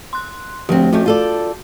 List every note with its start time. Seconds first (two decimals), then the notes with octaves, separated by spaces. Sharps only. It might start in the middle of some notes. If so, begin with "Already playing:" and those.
0.13 C6 F#6
0.69 D2 F3 A3 C4 G4
0.93 F2 A3 C#4 F#4 G6
1.06 F4 A4 D5